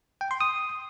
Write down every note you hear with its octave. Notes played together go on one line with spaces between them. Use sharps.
G5
C6
D#6